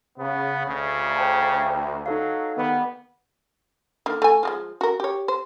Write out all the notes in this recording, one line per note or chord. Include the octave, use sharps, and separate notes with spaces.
C#3 B3
D2 C#3
C5 G5 A5
F#3 D#4 A4 F5
D#3 G3 B3
D3 D#3 A#3
A3 G#5
F3 G3 G#3
F#4 A#4
G4 C#5
C5